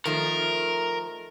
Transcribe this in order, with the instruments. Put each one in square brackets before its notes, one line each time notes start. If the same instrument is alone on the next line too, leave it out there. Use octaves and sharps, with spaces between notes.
[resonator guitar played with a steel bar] D#3 F3 A3 [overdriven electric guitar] A#4